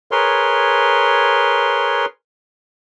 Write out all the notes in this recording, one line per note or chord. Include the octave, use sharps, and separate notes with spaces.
G#4 A#4 B4 C#5 C6